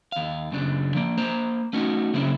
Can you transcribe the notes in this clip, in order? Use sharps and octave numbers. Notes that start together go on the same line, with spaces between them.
D#2 F5
F#2 C#3 D4
F3 A#3
A#3 C5 A#5
A3 C#4 D#4 F#4
C#3 F#3 A#3 C4 C#4 E4